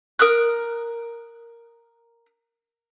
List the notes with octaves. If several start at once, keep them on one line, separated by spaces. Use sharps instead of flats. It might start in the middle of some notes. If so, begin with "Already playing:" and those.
A#4 D#6 F6 F#6